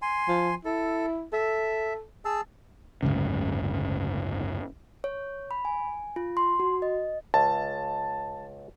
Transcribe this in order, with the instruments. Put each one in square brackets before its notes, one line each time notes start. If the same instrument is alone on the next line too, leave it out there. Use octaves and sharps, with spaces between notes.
[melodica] G#5 C6
[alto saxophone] F3
[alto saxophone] E4 [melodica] A4
[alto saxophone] A4 [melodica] E5
[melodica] G#4 A5 E6
[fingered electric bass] F#1 D2 G#2 C#3
[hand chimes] C#5
B5
G#5
F4
C6
F#4
D#5
[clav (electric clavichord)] C#2 [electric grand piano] A5